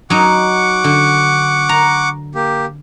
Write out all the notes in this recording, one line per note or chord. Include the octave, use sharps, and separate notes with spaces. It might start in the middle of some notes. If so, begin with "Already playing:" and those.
F#3 D#4 F#5 C#6 D6
D3
A#5
A#3 G4